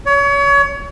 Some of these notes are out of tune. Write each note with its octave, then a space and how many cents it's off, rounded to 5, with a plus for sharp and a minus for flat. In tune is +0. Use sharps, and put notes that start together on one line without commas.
C#5 +30